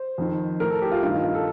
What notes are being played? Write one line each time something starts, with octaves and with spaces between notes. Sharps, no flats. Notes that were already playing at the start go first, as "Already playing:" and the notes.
Already playing: C5
F2 D#3
A2 A#4
A4
G4
F4
G2 D#3 F4
D#4
F4
A4